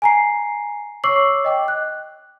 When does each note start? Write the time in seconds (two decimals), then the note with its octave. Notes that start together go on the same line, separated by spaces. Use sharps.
0.02 G#5 A#5 C7
1.04 C#5 C#6 D6 E6 C7 F#7
1.44 D#5 G5 D6
1.68 F#6